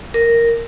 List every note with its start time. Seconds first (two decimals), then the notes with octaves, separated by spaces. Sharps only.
0.14 A#4